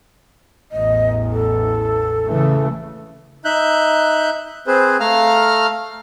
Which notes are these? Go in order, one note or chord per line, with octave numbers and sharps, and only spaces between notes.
A1 E2 D#5
A4
C#3 E3 A3
D#4 E5 F#6 G6
C4 G#4 B4 C5
A3 F5 A#5 F6